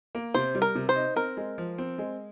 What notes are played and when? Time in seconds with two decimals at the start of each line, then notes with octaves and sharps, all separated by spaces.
0.15 A#3
0.34 C3 C5
0.55 G3
0.62 A#4
0.75 C3
0.89 C5
0.96 D#4
1.16 C4 A#4
1.37 G#3
1.58 F3
1.78 C4
1.98 G#3